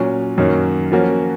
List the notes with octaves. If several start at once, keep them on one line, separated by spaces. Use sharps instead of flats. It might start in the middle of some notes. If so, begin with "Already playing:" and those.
Already playing: A#2 F#3 C#4
F#2 D#3 F#3 A#3 C#4
F3 A#3 C#4 F#4